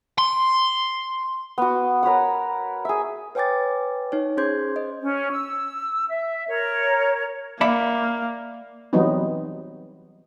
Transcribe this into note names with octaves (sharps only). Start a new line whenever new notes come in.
C6
B3 F#4
A#4 B4 C#5 F#5
G#4 E5
B4 C#5 G5 G#5 D6 A6
D#4 C#5
C#4 G#4 C5 C6 G6 G#6
C5 D#5
C#4
E6
E5
A#4 C#5
A#3 D5 E5 B5
E3 F#3 G3 B3 C4 D#4